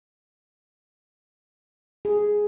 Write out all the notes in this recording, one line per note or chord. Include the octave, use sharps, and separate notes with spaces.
G#4